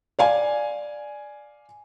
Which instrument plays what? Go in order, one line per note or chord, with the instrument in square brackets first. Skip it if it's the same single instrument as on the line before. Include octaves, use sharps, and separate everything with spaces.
[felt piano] D5 F5 G#5